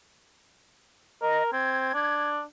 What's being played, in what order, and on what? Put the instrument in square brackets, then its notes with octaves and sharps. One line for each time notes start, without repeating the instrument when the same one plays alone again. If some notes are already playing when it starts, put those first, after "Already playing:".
[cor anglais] A#4 [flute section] D#5
[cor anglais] C4 [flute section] G#6
[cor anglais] D4